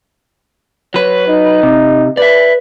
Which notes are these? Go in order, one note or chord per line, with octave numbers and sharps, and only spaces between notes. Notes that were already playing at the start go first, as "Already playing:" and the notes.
F#3 B4 C#5
D#4
C3
B4 D5 E5